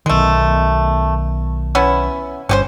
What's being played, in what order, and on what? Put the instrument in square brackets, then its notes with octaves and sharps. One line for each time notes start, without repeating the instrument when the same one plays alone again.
[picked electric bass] B1 D#3 [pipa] G#3 A3
[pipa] B3 C#4 E4
[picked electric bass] G1 [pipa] C#4 G4 C5